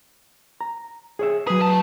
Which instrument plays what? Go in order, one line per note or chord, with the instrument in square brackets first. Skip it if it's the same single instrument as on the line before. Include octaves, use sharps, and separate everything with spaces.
[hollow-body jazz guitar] A#5
G#4 C#5 E5
[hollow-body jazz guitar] F#3 B4 [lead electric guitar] G#4
[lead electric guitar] A3 A5